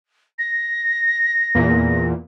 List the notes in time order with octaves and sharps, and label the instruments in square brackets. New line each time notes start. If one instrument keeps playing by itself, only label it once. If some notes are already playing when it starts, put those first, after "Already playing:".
[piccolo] A#6
[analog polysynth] E2 A#2